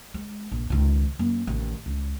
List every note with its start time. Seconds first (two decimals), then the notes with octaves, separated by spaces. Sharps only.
0.14 G#3
0.51 A#1
0.70 C#2 D#3
1.19 F#2 A#3
1.47 A1 D#3
1.86 C#2